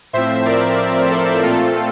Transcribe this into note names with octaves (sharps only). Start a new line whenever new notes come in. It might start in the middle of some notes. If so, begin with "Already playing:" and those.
A2 F3 C4 C5 E5
A#4 D5
A4 C5
A#2 A3 C4 F4 A4